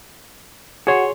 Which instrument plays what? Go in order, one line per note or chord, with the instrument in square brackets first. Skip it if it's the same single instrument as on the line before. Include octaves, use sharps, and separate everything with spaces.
[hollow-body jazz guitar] F#4 [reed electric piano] G#4 C#5 C6